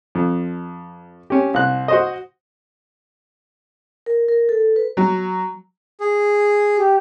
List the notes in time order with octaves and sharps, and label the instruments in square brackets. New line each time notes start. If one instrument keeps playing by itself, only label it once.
[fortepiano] F2
C#4 G4
C2 F#6
F#4 C5 D#5
[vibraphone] A#4
A#4
A4
B4
[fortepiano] F#3
[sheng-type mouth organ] G#4
[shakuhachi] G4